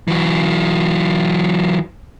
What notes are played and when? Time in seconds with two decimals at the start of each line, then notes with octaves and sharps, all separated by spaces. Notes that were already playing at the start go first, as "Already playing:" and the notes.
0.08 E3 F#3